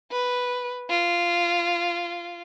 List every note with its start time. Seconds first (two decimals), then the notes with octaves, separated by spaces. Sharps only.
0.12 B4
0.90 F4